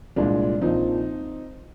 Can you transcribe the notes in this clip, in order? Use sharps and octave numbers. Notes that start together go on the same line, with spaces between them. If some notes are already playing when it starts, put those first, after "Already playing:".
C2 A#2 G#3 D4
A#1 A#2 F3 C4 D#4